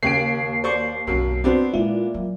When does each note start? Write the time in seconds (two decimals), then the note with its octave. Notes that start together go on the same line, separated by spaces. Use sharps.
0.03 D#2 C#3 G5 C7 D7
0.64 C5 D5 C#6
1.07 B1 F#2 D3 F#3
1.44 B3 C4 D4 F#4 C5
1.74 A#2 G#3 E4
2.14 F#3